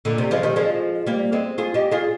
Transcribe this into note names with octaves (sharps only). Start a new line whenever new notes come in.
A#2 D3
C3
F3 G#3
D#3 G3
F3 G#3
G3 A#3
G#3 C4
F4 G#4
D#4 G4
F4 G#4